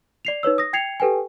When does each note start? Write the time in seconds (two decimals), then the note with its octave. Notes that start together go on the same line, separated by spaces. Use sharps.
0.25 D5 C7 F7
0.43 D#4 B4 C#5 E6
0.58 D#6 A#6
0.73 G5 G#6 C7 C#7 F7
1.00 G4 A4 B4 G5 G#5